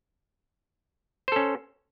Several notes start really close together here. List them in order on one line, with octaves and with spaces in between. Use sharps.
C5 A4 C#4